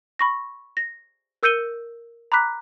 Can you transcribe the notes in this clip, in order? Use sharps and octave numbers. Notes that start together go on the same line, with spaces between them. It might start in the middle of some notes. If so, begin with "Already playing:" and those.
B5 C#6 A#6
A#6
A#4 E6 G6 C#7 D#7 G7
A#5 B5 D6 F#6 B6